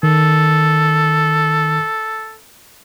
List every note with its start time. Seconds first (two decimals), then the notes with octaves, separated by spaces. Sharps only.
0.03 D#3 A4